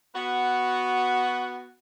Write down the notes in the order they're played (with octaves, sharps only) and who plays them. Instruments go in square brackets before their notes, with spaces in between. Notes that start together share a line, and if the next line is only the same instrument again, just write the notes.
[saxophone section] B3 F#4